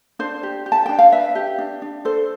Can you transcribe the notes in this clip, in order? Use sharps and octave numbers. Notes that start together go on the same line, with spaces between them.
D4 C5
G4
G4
A5
D4 G5
F5
B4 E5
G4
D4
D4
A4 C5